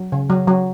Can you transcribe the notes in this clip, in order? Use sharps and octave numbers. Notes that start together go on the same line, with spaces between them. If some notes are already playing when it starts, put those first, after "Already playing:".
Already playing: F#3
C#3
F#3
F#3